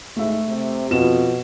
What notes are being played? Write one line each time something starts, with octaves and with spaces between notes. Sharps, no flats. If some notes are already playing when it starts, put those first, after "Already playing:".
G#2 A3 E5
C3
F2 B2 F4 E7